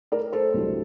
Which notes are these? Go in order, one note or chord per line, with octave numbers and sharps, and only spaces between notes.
A#4 D5
A4 C5
C2 C3 F#3 A3 D4